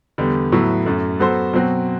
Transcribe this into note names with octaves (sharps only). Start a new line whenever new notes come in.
E2 D3 G3
A2 F#3 B3 E4
F#2 F#3 A3
F#3 B3 F#4 A4 C5
B2 F#3 C4 F#4